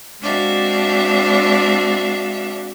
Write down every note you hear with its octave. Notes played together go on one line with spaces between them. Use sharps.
G#3 C4 D4 F#4 E5 F5